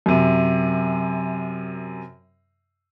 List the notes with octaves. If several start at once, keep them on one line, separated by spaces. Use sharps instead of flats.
F#2 C3